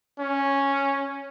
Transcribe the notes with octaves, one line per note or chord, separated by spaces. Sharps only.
C#4